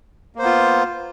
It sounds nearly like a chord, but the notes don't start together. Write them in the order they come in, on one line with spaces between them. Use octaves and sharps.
A#3 C5 B3 F4